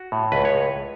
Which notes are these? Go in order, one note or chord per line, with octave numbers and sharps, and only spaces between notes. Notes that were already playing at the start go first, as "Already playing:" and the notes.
Already playing: F#4
A2
C#2 B4
C#5